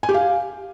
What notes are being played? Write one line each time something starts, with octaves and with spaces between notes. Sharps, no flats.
G#5
G4
F5